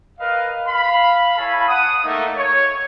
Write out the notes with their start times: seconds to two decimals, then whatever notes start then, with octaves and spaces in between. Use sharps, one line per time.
0.19 A#4 B4 D#5 F5
0.68 F5 B5
1.37 E4 A4 C#5 F5 G#5 B5
1.68 F#5 D#6
2.05 A3 A#3 D#4
2.37 C#5